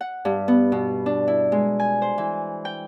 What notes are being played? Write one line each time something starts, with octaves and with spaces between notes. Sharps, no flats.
F#5
G2
B3
B2
D4
E4
G#3
G#5
C5
E3
G5